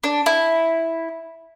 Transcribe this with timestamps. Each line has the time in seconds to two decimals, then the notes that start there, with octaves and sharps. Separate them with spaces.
0.03 D4
0.26 E4